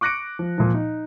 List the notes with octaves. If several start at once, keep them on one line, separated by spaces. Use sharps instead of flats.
C#6 D6 F#6 A#6 C#7 D7
F3
A#2 F3
D#4